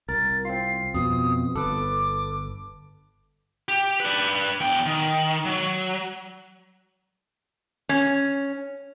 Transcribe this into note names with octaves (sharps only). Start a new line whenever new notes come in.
C2 A#4 A6
C4 F4 C7
F2 B2 D#6
G1 A4 B4 D6
G4
D4 B4
E2 G5
D#3
F#3
C#4